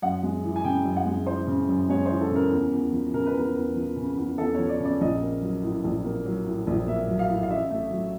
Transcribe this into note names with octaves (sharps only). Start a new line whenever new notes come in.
F#2 F#5
G#3
E3
G#5
C#3 G5
F#2
F#5
G#3
E3 C5
C#3
F#2
G#3 C#5
C5
E3
A4
C#3 A#4
E2
E2
F3
C#3 A#4
B4
E2 A#4
E2
F3
C#3
E2
E2 A4
C#5
F3
D5
C#3 D5
A#1 D#5
A#3
F#3
A2
A#1
A#3
F#3
A2
A#1
A#3 E5
F#3
F5
A2
F5
A1 E5
A3
F#3